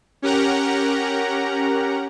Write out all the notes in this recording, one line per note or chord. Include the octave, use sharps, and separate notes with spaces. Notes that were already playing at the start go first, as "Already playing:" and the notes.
C#4 G4 A#4 F#5 A#5